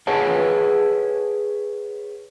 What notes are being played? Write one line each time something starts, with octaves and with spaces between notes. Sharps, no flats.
G#4 B4 C#5 F#5 A5